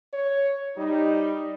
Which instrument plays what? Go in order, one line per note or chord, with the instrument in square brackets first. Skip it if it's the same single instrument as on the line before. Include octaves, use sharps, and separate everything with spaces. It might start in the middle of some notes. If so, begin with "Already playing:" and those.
[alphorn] C#5
[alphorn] G3 [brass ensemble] D#4